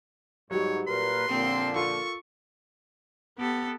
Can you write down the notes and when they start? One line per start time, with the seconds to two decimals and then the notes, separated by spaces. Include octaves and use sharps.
0.51 G#2 F#3 G3 C#5
0.87 A#2 A#4 B4 C6
1.29 A#2 D3 F3 C4
1.76 F4 A4 A#4 C#6
3.39 B3 G4 A4